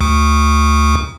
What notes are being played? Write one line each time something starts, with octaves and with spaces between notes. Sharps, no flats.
D2